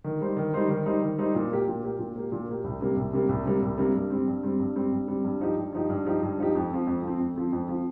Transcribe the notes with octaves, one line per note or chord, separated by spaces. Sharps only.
D#3
G3 D#4 C5
D#3
G3 D#4 C5
D#3
G3 D#4 C5
D#3
G3 D#4 C5
A#2
A#3 G4
A#2
A#3 G4
A#2
A#3 G4
A#2
A#3 G4
C2
C3 G3 A#3
C2
C3 G3 A#3
C2
C3 G3 A#3
C2
C3 G3 A#3
G2
G3 C4
G2
G3 C4
G2
G3 C4
G2
G3 C4
G2
F3 D#4 G4
G2
F3 D#4 G4
G2
F3 D#4 G4
G2
F3 D#4 G4
F2
F3 C4
F2
F3 C4
F2
F3 C4
F2
F3 C4